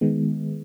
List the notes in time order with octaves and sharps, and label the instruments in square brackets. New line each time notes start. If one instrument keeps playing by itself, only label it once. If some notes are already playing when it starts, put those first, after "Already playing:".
[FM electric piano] D#3 G#3 B3